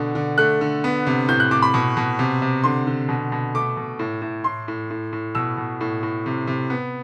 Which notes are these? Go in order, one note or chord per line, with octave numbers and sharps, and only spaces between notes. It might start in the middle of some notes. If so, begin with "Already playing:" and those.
Already playing: B2 D3
D3
A3 F#6
D3
B3
C3
A2 G6
F#6
A2 D6
B5
B2
B2
C3
C3
D3 C6
D3
B2
B2
A3 D6
B2
A2
A2
A2 C6
A2
A2
A2
B2 E6
B2
A2
A2
C3
C3
B3